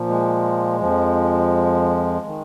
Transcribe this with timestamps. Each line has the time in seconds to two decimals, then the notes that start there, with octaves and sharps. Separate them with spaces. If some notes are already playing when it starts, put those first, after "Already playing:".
Already playing: A#2 F3
0.09 G#3
0.80 F2 F3
2.26 D#3